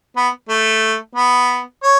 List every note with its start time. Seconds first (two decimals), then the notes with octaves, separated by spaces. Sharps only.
0.16 B3
0.49 A3
1.15 B3
1.83 C#5